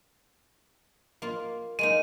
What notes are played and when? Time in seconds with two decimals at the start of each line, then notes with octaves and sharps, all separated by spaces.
1.22 A#3 F4
1.79 G#3 A#3 D#4 D#7